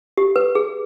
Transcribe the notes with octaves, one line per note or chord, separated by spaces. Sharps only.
G4
B4
G#4